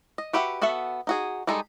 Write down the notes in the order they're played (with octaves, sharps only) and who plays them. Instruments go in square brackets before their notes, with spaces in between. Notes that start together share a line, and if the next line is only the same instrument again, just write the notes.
[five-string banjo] D#5
F#4 G4 B4 E5 F#5
B3 F#4 A4 E5 F#5
D#4 F#4 G#4
G3 G#3 D#4 G#4 A4